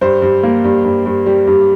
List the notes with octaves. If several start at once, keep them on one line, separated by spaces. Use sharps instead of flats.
G2 C5
G2
A#3
G2
G2
G2
G3
G2